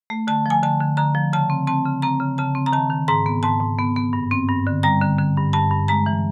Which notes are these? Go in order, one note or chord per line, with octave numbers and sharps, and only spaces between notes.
A3
D3 A5
F3 G#5
D3 A5
D3
D3 A#5
F3
C#3 A5
C4
C4 A5
C#3
C4 A#5
C#3
C#3 A5
C4
A#5
D#3 A5
D#3
G#2 A#5
B3
G#2 A5
G#2
B3
B3
G2
C4
G2
D3
G3 A#5
D3
D3
G2
G2 A5
G2
G#3 A#5
E3